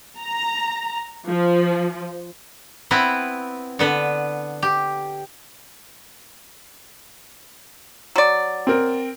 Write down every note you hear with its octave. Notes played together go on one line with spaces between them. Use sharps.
A#5
F3
B3 C4 E4 B4
D3 B3 B4
G4
F#3 D5
C4 A#4